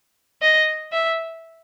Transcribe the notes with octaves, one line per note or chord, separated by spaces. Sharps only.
D#5
E5